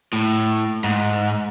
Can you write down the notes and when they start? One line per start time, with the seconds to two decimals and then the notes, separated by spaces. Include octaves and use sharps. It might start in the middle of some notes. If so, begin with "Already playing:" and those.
0.13 A2
0.84 G#2